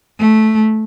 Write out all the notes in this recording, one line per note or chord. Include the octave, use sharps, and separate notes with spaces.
A3